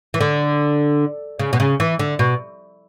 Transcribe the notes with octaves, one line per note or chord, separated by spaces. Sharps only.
E3
D3
C#3
B2
C#3
E3
D3
B2